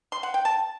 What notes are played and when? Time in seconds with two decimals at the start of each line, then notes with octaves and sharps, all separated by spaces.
0.12 C6
0.23 F#5
0.34 G5
0.45 A5